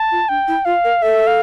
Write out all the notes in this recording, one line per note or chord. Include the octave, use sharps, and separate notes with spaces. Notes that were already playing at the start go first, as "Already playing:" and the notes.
Already playing: A5
F4
D4 G5
E4
F4 F5
A#4
A4 E5
F5